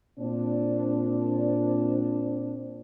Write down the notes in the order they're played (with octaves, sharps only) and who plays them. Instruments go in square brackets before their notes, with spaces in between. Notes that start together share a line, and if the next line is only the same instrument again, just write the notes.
[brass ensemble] A#2 C4 D4